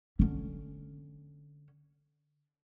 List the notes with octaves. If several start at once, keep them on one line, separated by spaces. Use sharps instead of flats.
D3 C#4